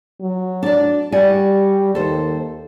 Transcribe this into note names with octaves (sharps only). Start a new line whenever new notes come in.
F#3
D4 D5
G3 F#4 D5 G#5
D#2 A4 C5